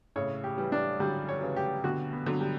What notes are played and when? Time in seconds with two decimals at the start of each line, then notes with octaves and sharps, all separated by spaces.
0.16 A2 C#3 C#5
0.44 G4
0.58 E3 G3
0.72 D4
1.00 D3 F#3 G3
1.29 C#5
1.36 F#3
1.42 C#3 E3
1.56 G4
1.84 B2 D3 F#4
2.13 B3
2.26 D3 F#3
2.40 G3